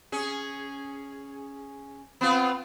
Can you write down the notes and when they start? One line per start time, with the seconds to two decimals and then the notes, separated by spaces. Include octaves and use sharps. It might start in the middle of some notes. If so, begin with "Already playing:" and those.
0.12 C#4 G#4
2.21 B3 C4 F4